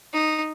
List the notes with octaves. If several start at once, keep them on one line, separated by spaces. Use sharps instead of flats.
D#4